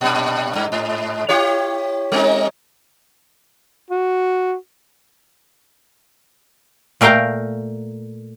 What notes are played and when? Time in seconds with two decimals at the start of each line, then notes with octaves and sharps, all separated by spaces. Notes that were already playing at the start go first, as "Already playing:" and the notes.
0.01 G2 A#2
0.55 G2
0.72 G#2
1.29 E4 G4 C#5
2.12 G3 C4 D#4
3.90 F#4
7.01 A#2 A3 A#4 F5 G5 A#5